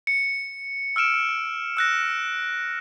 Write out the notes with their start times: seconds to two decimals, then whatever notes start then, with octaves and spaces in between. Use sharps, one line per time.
0.07 C#7
0.96 E6 F6 D7 E7
1.77 E6 F#6 A#6